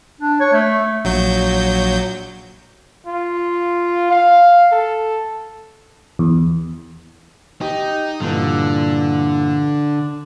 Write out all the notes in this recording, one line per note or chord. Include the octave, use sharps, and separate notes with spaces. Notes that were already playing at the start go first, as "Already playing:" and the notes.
D4
C#5
A3
A#1 F#3 G6
F4
F5
A4
E2
D#4 G4
G2 A#2 D3 E3